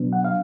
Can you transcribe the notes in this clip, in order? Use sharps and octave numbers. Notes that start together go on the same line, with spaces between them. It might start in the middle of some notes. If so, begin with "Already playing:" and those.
Already playing: B2 F#3 B3 D4
F#5
F5